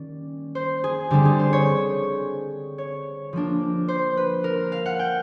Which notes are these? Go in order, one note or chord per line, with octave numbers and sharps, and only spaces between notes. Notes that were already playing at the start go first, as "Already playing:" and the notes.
Already playing: D#3 G3 A#3 C#4 D5
C5
G#4
D3 G3 C4 G4
G#4
C5
C#5
C#5
F3 A#3 D4
C5
B4
A#4
F5
F#5
G5